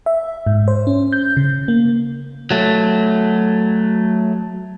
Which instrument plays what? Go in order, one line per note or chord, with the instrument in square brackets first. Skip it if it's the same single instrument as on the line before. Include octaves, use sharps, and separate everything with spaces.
[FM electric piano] E5
G#2
C5
C#4
G6
C#3
A#3
[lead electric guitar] F#3 A3